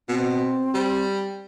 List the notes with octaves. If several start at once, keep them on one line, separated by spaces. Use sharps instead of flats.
B2 C4
G3